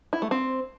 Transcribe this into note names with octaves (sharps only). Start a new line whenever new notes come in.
E4
A3
C4